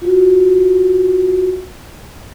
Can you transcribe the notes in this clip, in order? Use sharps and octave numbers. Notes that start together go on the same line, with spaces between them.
F4 F#4